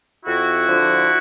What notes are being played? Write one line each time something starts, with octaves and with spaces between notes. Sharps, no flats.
F2 E4 F#4
D3 F3